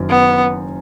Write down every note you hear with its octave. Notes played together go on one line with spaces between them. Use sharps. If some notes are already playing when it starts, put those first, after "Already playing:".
Already playing: F#1 F#2 D#3
B3